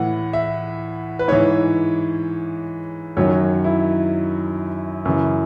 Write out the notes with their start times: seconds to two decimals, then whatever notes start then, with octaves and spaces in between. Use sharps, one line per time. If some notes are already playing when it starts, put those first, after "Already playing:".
Already playing: A2 E3 F#5
0.33 E5
1.19 B4
1.28 G#2 E3 C#5
3.17 F#2 D#3 F#3 C#5
3.64 E4
5.05 F#2 C#3 E3